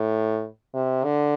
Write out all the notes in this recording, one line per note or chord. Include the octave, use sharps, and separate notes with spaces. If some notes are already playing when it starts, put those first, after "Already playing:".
Already playing: A2
C3
D3